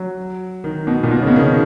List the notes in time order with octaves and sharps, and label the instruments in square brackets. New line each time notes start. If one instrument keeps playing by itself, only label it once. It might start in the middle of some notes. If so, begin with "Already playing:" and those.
Already playing: [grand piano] F#3
D#3
B2
A#2
B2
C#3
B2
D#3
C#3